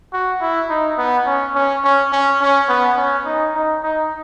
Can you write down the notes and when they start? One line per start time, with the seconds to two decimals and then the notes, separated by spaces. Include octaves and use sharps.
0.13 F#4
0.41 E4
0.70 D#4
0.98 B3
1.26 C#4
1.55 C#4
1.84 C#4
2.12 C#4
2.41 C#4
2.68 B3
2.97 C#4
3.25 D#4
3.55 D#4
3.83 D#4